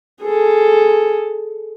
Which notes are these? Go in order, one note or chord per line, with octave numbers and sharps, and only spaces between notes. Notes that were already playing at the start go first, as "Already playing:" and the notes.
G#4 A4